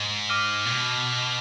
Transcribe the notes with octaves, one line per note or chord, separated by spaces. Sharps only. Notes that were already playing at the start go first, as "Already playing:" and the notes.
Already playing: G#2
D6 F6 A#6 D#7 G7
A#2
B2